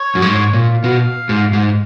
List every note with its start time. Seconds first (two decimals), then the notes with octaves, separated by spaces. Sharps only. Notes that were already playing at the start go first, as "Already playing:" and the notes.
Already playing: C#5
0.15 F#2
0.22 G#2
0.53 A#2
0.84 B2 F5
1.29 G#2
1.53 G#2